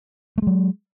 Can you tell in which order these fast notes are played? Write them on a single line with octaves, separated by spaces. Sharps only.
A3 G#3 F#3